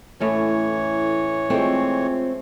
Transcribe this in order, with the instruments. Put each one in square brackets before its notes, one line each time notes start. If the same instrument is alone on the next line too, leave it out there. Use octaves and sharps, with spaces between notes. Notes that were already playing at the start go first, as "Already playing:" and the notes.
[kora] A2 A3 C#4 [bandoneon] E3 C#5 [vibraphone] E4 A4
[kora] G#3 A3 [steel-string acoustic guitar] C4 [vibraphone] F4